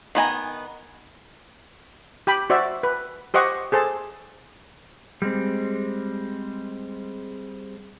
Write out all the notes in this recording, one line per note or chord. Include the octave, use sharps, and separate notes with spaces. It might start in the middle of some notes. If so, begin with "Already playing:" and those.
D#3 B3 G#5 A#5
G4 G5 B5
F#4 C5 D5 E5
B4
G4 C5 D#5 F#5 C#6
G#4 A4 C5 A5
G3 G#3 C4